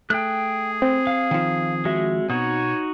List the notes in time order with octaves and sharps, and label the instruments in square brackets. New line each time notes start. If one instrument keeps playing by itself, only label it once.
[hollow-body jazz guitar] A3 [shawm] G#4 [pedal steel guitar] G5 F#6
[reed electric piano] C4
[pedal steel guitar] F5
[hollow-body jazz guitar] D#3 F3
[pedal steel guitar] G#3 F#4 E5
[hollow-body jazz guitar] B2 [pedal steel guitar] D#4 F#4 D#6 [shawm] C#5